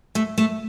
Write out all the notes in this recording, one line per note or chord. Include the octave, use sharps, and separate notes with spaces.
A3
A3